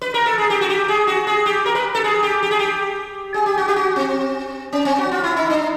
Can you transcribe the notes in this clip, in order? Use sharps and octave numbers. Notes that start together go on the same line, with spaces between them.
B4
A#4
A4
G#4
G4
F#4
G4
G#4
F#4
G#4
G4
A#4
B4
A4
G#4
G4
G4
G#4
G4
G#4
G4
F#4
G4
F#4
C4
C#4
C4
F#4
F4
E4
D#4
D4